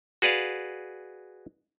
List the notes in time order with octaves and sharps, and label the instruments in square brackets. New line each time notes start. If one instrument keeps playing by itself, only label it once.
[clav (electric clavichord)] F#4 G#4 B4 D5 F5